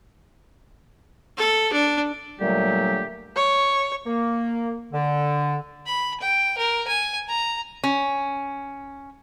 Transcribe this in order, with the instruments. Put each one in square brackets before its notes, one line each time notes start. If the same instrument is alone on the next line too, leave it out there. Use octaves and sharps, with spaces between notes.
[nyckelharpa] A4
D4
[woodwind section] A#2 D3 F#3 G3 A3 G4
[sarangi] C#5
[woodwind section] A#3
D3
[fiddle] B5
G5
A#4
G#5
A#5
[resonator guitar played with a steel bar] C#4